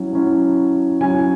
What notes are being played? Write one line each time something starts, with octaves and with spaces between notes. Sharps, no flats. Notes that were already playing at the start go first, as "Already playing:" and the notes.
Already playing: F#3 C#4 E4
F#3 C#4 E4
F#3 C#4 E4 G#5